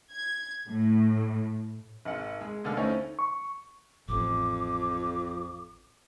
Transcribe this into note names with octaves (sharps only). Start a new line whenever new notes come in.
G#6
A2
G#1 F#5 F6
G#3
D#2 D3 A#3 F6
A3 C4 C#4 D#4 E4 C#5
C#6
A1 F2 D6